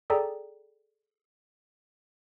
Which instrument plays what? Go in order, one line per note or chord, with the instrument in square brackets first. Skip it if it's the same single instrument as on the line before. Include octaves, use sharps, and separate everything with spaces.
[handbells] G#4 A4 D5 G5 A#5